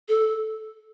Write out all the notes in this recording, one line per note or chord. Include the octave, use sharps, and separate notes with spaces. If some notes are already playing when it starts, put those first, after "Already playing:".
A4